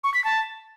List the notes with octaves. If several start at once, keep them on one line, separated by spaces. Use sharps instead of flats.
C#6
B6
A5